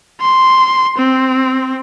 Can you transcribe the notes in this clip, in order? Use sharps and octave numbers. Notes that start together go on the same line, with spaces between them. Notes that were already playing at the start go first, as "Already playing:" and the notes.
C6
C4